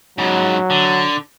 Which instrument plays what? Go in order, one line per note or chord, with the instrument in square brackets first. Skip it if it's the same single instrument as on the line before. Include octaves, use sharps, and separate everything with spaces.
[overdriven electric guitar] G#2 C#3 [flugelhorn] F#3
[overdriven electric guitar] D3